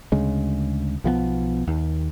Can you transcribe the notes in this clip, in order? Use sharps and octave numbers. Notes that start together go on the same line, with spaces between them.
D2 C#3 G#3
B1 F3 F#3 B3
D#2